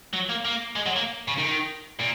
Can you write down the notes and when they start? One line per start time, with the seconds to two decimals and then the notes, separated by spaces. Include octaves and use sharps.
0.13 F#3
0.29 A#3
0.45 A#3
0.76 G#3
0.86 F#3
0.96 A#3
1.28 C#3
1.38 D#3
2.00 A#2